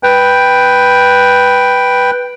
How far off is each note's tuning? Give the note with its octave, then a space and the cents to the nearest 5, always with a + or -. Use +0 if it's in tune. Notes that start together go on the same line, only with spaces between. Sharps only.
B4 +0 G5 +0